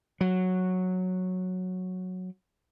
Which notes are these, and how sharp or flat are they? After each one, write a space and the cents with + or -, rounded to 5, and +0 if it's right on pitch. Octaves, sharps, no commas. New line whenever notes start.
F#3 -10